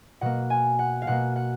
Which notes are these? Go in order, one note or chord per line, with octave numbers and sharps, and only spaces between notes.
B2 A#3 F#5
G#5
F#5
F5
B2 A#3 F#5
F#5